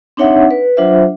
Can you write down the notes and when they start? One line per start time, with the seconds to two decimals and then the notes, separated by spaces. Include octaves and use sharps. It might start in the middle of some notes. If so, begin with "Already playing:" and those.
0.17 C4 D4 D#4 C#5 E5 F#5
0.51 B4
0.77 F#3 D4 F4 C5 E5